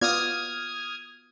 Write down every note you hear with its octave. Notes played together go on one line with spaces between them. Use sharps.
B3 F4 D5 D#6 F6 G#6